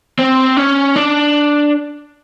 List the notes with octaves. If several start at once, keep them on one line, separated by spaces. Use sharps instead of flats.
C4
C#4
D4